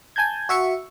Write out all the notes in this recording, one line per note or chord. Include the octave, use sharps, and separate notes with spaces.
G#5 A5 G6 G#6
F#4 E5 C#6 C#7